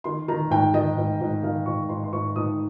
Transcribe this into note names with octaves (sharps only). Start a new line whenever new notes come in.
D#3 C6
D#3 A#5
G#2 G5
D#3 D#5
G#2
G#2
D#3 F5
G#2 C#6
G#2 C6
C6
G#2 C#6
G#2 D#6